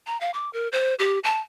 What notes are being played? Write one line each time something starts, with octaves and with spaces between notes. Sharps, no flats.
A#5
F5
D6
A#4
C5
G4
A5